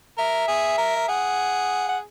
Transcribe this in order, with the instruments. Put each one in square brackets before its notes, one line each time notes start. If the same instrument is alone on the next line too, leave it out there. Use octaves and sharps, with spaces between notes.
[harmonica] A#4 [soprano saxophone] E5
[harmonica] G#4
A#4
[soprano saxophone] E5
[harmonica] G#4 [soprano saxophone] F#5
[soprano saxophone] F#5